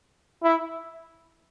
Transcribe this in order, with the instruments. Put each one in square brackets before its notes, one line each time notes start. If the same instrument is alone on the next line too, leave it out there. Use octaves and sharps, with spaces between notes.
[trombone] E4